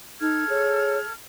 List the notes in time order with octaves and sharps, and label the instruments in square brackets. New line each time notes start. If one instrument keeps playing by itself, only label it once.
[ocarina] D#4 [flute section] A4 F6 G#6
[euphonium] G#4 [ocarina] C#5